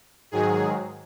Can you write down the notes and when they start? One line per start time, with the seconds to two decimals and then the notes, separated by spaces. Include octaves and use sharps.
0.31 G#2 D#3 F#3 G#4